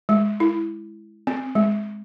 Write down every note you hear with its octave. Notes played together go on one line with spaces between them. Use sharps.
G#3
E4
C4
G#3